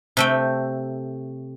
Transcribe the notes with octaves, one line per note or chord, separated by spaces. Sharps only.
C3 A3 G5